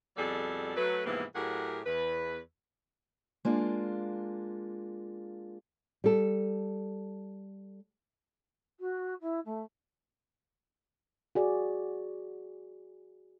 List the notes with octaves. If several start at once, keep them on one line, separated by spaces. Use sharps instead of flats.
F2 B2 G3 G#4 A4 D5
F#3 A3 B4
G#2 C3 E3 F3 A#3 B3
A2 F#3 G4 G#4 A#4 F#5
E2 B4
G#3 A#3 D4 F4
G3 A4
F#4
E4
A3
F#4 G#4 D5